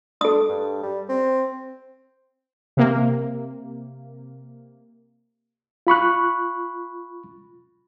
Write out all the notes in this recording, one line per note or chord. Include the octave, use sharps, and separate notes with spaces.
D4 A4 D#6
G2
G3
C4
C3 A#3
F4 B5 C#6 F#6